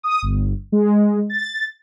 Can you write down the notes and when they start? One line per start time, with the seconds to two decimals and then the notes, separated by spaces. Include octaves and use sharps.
0.03 D#6
0.23 G1
0.72 G#3
1.30 A6